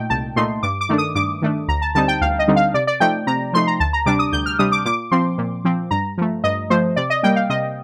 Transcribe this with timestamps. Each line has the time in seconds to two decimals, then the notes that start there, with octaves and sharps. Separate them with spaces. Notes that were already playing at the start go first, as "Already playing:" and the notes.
Already playing: A#2 A3 D#4 G5
0.10 C2 A5
0.36 A#2 A3 D#4 C6
0.63 G2 D6
0.81 D6
0.89 D#3 A3 D4
0.98 D#6
1.15 G2 D6
1.42 D#3 A3 D4
1.68 D2 A#5
1.82 A5
1.95 D3 G3 C4 D#4 A5
2.08 G5
2.21 D2 F5
2.39 D#5
2.48 D3 G3 C4 D#4
2.56 F5
2.74 C3 D5
2.87 D5
3.00 F3 A3 D#4 G5
3.27 C3 A#5
3.53 F3 A3 D#4 C6
3.67 A#5
3.80 D2 A5
3.93 A#5
4.06 C3 G3 D4 D6
4.19 D#6
4.33 D2 G6
4.46 F6
4.59 C3 G3 D4 D#6
4.72 D6
4.85 A#2 D6
5.11 F3 C4 C6
5.38 A#2
5.65 F3 C4
5.91 G2 A#5
6.18 F3 A3
6.44 G2 D#5
6.70 F3 A3 C5
6.96 C3 D5
7.10 D#5
7.23 G3 A#3 G5
7.36 F5
7.49 C3 D#5